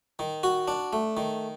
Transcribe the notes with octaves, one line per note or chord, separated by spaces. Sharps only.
D#3
F#4
D4
A3
D#3